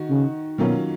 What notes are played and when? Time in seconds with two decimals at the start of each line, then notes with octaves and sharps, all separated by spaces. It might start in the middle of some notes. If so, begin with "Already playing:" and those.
Already playing: D#3 F#4
0.10 C#3
0.58 B2 D#3 F#3 A#3 C#4 F4